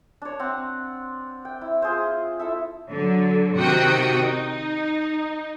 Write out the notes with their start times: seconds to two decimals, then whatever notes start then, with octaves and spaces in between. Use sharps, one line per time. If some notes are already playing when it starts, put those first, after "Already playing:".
0.22 D4 C#5
0.39 C4 F#5
1.45 G5
1.61 E4
1.82 F4 G#4 C5
2.39 E4 A4 E5
2.90 D3 F#3
3.57 C3 D#3 F#4 G5 D#6 C#7
4.24 D#4